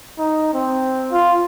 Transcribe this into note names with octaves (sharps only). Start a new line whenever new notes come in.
D#4
C4
F4